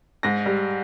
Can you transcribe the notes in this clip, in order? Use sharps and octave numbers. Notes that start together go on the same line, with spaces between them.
G#2 A#6
G3